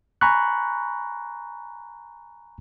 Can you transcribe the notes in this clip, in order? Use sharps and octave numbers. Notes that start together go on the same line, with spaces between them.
G#5 A#5 B5 C#6 F#6